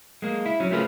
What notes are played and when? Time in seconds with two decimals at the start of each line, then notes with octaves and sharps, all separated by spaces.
0.22 G#3 A#3
0.46 E4
0.60 F#3 C#4
0.71 A3 C#4 F4 G#4 A#4 B4